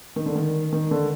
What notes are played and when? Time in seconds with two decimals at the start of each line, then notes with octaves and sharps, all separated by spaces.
0.16 D#3
0.26 D3
0.35 D#3
0.73 D#3
0.91 D3